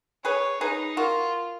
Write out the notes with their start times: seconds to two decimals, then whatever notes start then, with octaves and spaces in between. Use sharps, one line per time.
0.25 G#4 B4 C#5
0.61 D#4 G#4 B4
0.97 F4 F#4 A#4